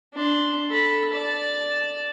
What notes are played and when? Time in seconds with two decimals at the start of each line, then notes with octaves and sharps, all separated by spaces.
0.14 D4 C6
0.70 A4 B5
1.13 D5 A5